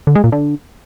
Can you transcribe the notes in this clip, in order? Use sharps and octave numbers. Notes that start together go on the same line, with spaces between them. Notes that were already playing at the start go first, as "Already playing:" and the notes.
D3
G#3
A#2
D3